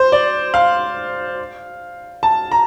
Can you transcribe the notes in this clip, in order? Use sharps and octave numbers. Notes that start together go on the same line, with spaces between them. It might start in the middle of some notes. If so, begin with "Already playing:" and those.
Already playing: C5
D5
F5
A5
A#5